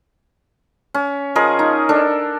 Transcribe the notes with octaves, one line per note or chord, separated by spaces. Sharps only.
C#4
F3 G#4 A#4 D#5
D#4
D4 A4 A#4